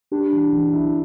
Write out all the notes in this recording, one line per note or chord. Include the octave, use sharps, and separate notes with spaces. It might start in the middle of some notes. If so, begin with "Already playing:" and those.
D4 G4
E3
E3
E4